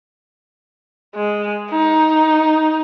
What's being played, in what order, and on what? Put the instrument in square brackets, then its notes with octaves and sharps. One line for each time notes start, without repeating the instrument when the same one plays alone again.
[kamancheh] G#3
D#4